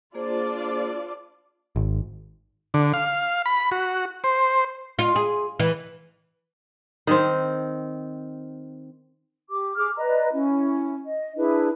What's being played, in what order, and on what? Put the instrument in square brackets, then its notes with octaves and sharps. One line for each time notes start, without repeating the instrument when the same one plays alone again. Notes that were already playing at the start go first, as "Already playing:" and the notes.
[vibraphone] A#3 G#4 C5 [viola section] D4 F4 D5
[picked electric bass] G#1
[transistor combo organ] D3
F5
B5
F#4
C5
[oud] F4
G#4
E3
[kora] D#3 C4
[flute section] G4 D6
G#4 D6 F6
B4 D5 D#5 A#5
C#4 E4
D#5
D4 E4 G#4 B4